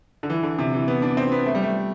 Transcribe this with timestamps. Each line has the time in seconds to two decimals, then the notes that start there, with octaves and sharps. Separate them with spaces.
0.23 D3
0.30 E3
0.43 D3
0.59 C3
0.74 E3
0.88 B3
1.02 D4
1.17 C4
1.32 B3
1.46 A3
1.55 G3
1.63 A3